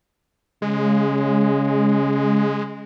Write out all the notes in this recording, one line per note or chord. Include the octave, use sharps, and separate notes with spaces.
C#3 G#3